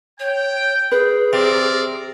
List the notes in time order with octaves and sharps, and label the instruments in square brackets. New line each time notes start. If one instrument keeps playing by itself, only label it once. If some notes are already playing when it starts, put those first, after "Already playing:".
[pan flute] C#5 [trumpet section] G5
[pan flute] G#4 [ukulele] B4
[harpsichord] C3 [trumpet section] A#4 D5